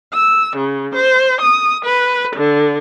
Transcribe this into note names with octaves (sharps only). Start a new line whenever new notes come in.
E6
C#3
C5
D#6
B4
D3